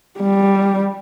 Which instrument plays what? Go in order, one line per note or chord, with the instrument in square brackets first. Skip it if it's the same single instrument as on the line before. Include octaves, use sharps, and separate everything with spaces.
[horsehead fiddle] G3